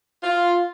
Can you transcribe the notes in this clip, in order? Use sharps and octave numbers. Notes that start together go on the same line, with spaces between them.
F4